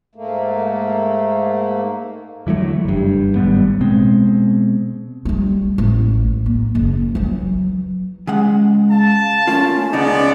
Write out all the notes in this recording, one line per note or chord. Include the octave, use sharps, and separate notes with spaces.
G#2 A3 A#3
D3 E3 F#3 A3
F#1 G2
G#1 A2 G3 B3
B2 G#3 C4
G3 A3
A1 A3
A#3
F#1
E3 F#3
C#3 G#3 F#5
F5 A5
A3 A#3 C#4 F4
C#2 C#3 B3 D#4 D5